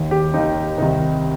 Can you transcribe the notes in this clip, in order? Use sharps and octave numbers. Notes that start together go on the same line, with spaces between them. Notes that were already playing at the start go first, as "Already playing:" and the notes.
Already playing: D#2 D#3
G4
D#2 D#3 D#4
C2 C3 D#3 D#4